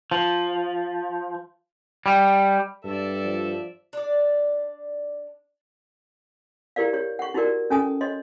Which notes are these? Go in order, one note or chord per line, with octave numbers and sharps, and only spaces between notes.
F3
G3
G2 A4 D5 E5
F3
D4 D5
E4 G4 A#4 D5 F5
G4 C#5
F#5 C#6
D#4 E4 F#4 G4 A#4 D5
C#4 A4 G#5 A5 D#6
C#5 D#5 C6